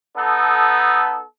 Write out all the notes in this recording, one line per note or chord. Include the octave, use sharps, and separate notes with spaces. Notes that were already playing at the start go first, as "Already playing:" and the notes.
B3 D#4 A4